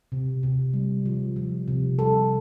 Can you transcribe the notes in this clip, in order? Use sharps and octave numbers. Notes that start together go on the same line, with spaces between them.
C3
C3
G3
F3
F3
C3
G3 A4